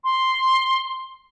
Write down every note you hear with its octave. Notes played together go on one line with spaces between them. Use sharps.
C6